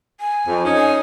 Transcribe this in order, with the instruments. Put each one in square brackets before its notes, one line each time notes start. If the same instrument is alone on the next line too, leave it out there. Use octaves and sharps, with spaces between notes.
[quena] G#5
[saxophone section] F2
C#4 D#4
[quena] G#5